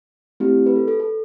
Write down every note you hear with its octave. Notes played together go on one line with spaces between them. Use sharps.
A3 C4 E4 G4
B4
A4
A4
A4